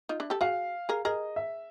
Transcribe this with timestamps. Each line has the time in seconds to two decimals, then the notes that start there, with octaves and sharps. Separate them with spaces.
0.09 D#4 F4
0.20 D4 E4
0.30 G4 A4
0.41 F#4 G#4 F5
0.89 G#4 A#4
1.05 G#4 A#4 D#5
1.36 E5